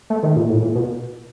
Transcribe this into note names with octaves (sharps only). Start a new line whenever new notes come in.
A3
D#3
A#2
A2
A#2
B2